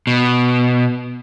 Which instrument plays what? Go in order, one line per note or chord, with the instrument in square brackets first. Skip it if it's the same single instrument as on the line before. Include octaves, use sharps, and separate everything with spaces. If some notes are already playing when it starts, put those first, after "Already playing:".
[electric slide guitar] B2